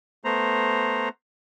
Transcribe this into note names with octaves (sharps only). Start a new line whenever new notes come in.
A3 B3 C5 A#5